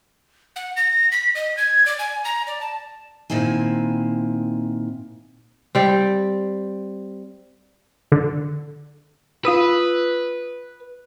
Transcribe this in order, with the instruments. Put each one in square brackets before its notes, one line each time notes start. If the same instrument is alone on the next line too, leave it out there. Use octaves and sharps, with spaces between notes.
[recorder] F#5
A#6
B6
D#5
G#6
D5
G#5
A#5
D5
A5
[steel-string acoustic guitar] A#2 D#3 C4 E4 G#5
[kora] G3 C4
[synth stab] D3
[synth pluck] F4 D#6 E6 [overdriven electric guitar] B4